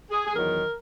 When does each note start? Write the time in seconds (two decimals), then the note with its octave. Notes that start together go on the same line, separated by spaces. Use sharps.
0.11 G#4
0.27 G#4
0.35 E2 D#3 F#3 A#4